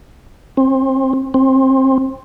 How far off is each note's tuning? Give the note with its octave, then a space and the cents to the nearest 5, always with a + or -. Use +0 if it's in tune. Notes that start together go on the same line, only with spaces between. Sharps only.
C4 +30
C4 +25